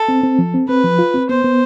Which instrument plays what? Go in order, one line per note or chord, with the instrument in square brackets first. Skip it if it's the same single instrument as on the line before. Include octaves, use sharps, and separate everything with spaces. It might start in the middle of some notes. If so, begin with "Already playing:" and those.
Already playing: [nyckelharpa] A4
[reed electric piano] C4
C4
F3
C4
[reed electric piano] C4 [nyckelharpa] B4
[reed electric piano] F3
F4
C4
[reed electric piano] B3 [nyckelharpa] C5
[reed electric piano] B3